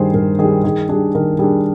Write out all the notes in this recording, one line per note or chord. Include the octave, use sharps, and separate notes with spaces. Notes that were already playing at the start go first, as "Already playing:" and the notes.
Already playing: G2 D#3 G3 G#4 C5
G2 A#4
D#3 G3 G#4
D#3 G#4
G3 D4 G#4
D#3 A#4
G3 D4 G#4